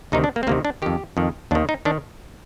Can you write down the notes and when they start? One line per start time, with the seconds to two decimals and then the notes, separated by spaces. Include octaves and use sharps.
0.12 D2 C3 D#3 D#4
0.24 D4
0.36 A#3
0.43 C4
0.47 D2 C3 D#3 A#3
0.65 D4
0.82 F2 D#3 G4
1.17 F2 D#3
1.51 D#2 D4
1.55 D#3
1.69 D#4
1.85 D#3 D4